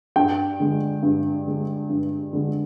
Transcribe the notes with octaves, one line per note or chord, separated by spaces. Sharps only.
G2 G5
D3 G#3
G2
D3 G#3
G2
D3 G#3